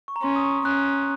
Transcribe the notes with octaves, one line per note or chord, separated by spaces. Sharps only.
C#6
A#5
C#4 C6
D#6
C#6
C#4 F#6